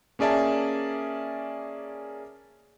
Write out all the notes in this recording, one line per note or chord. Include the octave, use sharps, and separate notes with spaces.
A#3 C#4 G#4 D5 E5 A5